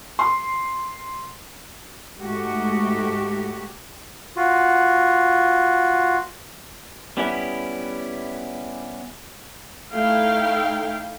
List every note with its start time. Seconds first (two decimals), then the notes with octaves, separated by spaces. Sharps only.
0.19 C6
2.20 G#2 A3 F#4 G4
4.36 F4 F#4
7.17 G3 B3 C#4 E4 G4
9.94 A3 D#4 E4 F5 G5